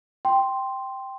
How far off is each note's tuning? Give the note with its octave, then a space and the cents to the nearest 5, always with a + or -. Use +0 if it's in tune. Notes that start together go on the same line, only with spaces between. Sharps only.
G5 +0 C6 +0